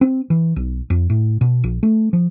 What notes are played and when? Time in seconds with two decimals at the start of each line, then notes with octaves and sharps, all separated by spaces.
0.01 C4
0.30 E3
0.56 B1
0.90 F2
1.10 A2
1.41 B2
1.64 A#1
1.83 A3
2.13 F3